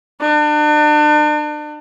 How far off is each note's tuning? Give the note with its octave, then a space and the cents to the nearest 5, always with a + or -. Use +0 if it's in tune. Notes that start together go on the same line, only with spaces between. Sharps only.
D4 +35